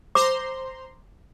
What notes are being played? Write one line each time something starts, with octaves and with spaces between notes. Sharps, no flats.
C5 A#5 C6 D6